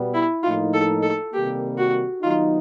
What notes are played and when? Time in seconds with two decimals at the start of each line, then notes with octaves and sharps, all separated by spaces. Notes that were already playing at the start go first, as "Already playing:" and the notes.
Already playing: B2 G3 B3
0.14 E4
0.43 A2 F3 A#3 D#4 F4
0.73 A4
1.03 A4
1.34 C3 D#3 G3 A#3 G4
1.78 F#4
2.22 D#3 F#3 B3 D#4 F4